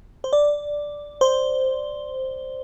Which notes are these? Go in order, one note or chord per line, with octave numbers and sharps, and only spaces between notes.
C5
D5
C5